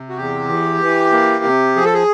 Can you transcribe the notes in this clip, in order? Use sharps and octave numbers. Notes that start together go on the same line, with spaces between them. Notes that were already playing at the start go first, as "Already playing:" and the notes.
Already playing: C3
F#4
E2 G4
E3
E3
A#3
C3
F3 G#4
A4
G#4